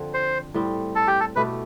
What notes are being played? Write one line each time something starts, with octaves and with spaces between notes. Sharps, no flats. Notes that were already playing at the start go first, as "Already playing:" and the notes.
Already playing: D3 F3 C4
C5
A2 G3 C4
A4
G4
A4
B2 A3 E4 G4 B4